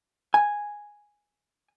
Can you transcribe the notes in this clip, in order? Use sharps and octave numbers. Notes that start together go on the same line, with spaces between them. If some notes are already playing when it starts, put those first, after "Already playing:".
G#5